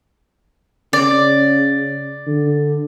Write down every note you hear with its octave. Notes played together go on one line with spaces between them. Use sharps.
C#3 D5
D3